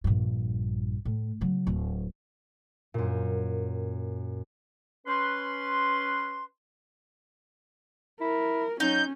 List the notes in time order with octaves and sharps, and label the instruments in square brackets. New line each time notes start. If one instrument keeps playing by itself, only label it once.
[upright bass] A#1 G2
A2
C#3 F#3
D1
[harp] F#2 A#2
[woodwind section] C#4 B4 C6
[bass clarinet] E4 [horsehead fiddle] A#4
[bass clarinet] F#3 [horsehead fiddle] C#4 [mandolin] D#4 [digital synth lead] G6